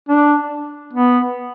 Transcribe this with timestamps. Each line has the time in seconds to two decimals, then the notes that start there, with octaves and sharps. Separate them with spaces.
0.09 D4
0.93 B3